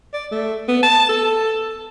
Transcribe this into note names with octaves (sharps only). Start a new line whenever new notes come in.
D5
A3
B3
A5
A4